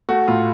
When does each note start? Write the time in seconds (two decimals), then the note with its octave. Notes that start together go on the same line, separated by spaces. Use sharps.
0.09 A3 F#4
0.28 A2 F4